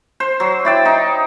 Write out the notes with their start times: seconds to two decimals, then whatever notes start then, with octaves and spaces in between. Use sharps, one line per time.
0.20 C5
0.40 F#3
0.65 E4 D5 G5
0.85 D#4